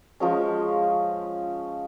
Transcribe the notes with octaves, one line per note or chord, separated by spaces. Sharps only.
F3 G#3 C#4